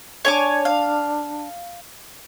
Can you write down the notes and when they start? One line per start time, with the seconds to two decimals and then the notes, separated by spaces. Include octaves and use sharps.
0.25 D4 C#5 G#5 D6
0.65 F5